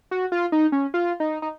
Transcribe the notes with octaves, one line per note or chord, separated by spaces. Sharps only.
F#4
F4
D#4
C#4
F4
D#4
D#4